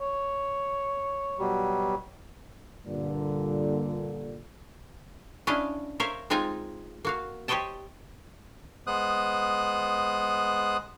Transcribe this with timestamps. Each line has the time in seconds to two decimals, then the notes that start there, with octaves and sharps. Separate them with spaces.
0.01 C#5
1.39 B2 F#3 G3
2.85 G2 A#2 D3
5.47 C#4 D4 E4 D#5 F5
6.00 A#4 C5 C#5 E5 F5
6.30 G#3 C4 D#4 F4 G#5 A#5
7.05 A#3 F#4 F5
7.48 G4 C5 C#5 D#5 G5 A5
8.87 G#3 B3 C5 D#6 F#6